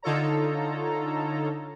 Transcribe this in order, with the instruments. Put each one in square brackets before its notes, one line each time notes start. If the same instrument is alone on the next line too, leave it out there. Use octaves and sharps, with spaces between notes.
[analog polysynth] D3 D#4 F4 A4 C#5 A#5